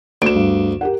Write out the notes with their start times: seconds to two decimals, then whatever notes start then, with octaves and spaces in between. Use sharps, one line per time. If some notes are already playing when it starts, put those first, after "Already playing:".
0.22 D2 D7 E7
0.35 G2
0.81 G4 A#4 F#5